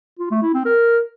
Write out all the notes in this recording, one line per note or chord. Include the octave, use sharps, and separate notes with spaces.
F4
A3
E4
C4
A#4